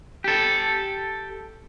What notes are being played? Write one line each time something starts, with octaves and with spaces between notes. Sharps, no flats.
G4 A4